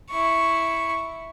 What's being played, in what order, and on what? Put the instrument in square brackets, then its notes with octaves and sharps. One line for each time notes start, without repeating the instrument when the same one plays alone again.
[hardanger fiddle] E4 C#6